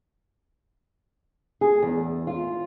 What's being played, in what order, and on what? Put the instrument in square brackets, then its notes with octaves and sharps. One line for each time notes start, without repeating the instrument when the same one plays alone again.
[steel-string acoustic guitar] G#4
E2
F4